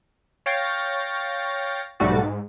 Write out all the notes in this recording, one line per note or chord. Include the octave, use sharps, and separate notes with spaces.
C#5 F5 G5 A6 A#6
B1 G#2 G3 A3 F#4 A6
G#2